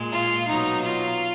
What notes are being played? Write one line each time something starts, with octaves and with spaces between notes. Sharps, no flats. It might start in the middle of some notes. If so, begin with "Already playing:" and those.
Already playing: A#2 G#3
F4
B2 F#3 D#4
F4